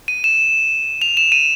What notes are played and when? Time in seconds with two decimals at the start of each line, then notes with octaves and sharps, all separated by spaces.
0.08 D#7
0.24 E7
1.02 F7
1.17 E7
1.32 D#7